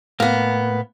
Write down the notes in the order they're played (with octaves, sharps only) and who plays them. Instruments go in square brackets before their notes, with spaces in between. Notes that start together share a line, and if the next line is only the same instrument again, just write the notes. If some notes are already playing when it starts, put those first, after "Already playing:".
[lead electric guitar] A2 [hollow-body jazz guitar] A#3 B3